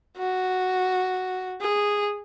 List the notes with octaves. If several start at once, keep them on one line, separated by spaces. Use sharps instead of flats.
F#4
G#4